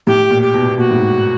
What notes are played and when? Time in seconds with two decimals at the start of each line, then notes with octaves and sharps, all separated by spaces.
0.07 A2 G4
0.30 A#2
0.42 G4
0.54 B2
0.68 B2
0.78 A#2 F#4
0.91 A2
0.96 G#2